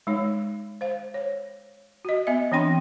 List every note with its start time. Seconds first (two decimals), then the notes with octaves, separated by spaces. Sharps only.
0.07 G#3 D#4 C#5
0.81 C5 F5
1.14 C#5
2.05 F#4 D#5
2.27 B3 D#5 E5
2.52 E3 C4 D4 G5 C6